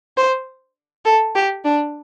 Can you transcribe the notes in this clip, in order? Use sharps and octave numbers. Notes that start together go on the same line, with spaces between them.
C5
A4
G4
D4